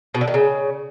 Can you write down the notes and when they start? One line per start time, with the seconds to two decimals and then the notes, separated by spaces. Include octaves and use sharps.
0.15 B2
0.21 D3
0.27 D#3
0.34 C#3